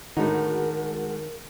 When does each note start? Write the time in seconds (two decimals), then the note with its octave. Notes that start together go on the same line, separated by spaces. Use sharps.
0.17 A2 D3 D#3 G#3 D#4 F#4 A#4